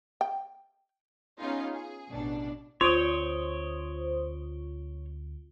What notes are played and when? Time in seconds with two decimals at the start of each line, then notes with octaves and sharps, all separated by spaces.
0.21 G5
1.40 B3 C#4 D#4 F4 G#4
1.74 G#4
2.12 A1 B2 D4
2.81 D2 C4 F4 C5 C#5 D#6 D7 G7